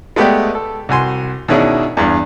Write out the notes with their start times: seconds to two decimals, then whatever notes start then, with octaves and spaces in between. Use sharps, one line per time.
0.16 G#3 A3 B3 G4 D5 G5
0.55 A4
0.89 C2 F#4 G#5 C6
1.48 B2 D#3 C#4 D4 E4 G#4
1.97 E2 G2